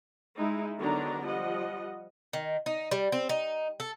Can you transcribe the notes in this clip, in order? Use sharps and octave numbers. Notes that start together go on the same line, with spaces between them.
G#3 D#4 E4
D3 D#3 F#3 B3 D4 A#5
F3 G3 D#5 F#5
D#3
D#4
G3
C4
D#4
A4